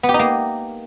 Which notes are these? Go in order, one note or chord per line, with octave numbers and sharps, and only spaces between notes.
B3
G4
D#4
A#3